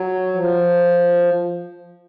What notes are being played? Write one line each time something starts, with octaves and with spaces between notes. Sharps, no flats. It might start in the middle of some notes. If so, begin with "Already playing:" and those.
Already playing: F#3
F3